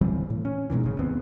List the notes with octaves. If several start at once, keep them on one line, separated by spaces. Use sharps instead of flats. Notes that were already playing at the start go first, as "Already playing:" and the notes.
D1 E3 G3 C4
A2
C#4
G#2 B2 D3 E3
G#1 C#3
D#2 B3 C4